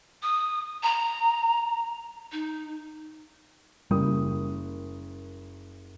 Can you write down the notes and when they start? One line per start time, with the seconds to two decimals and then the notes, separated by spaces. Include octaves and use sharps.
0.22 D#6
0.83 A#5
2.32 D#4
3.91 F#1 G3 A#4 D#6